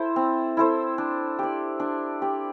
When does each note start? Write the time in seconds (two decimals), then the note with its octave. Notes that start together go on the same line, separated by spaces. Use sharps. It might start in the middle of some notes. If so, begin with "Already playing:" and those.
Already playing: E4 A4 C5
0.16 C4
0.57 E4 A4 C5
0.98 D4
1.39 G4 D5
1.80 D4
2.22 G4 D5